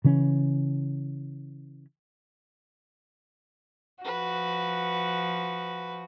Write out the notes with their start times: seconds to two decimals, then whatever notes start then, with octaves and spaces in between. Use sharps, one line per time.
0.04 C#3 E3 C#4
4.05 F3 F#4 B4